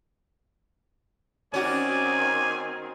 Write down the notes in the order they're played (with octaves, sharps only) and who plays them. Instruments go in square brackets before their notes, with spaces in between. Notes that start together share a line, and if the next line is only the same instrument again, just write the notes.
[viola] D#3 C4 [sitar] C#4 F#4 [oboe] D5 [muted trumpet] G#5